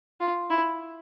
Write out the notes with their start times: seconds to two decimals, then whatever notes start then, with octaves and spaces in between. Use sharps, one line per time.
0.20 F4
0.50 E4